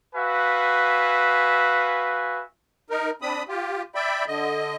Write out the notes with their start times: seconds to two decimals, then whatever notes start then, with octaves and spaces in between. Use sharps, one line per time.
0.15 F#4 B4 E5 F5 G#5
2.90 D#4 A#4
3.22 C4 D4 B5 D#6
3.48 F4 G4
3.95 D5 E5 G5 B5
4.27 D3 D#5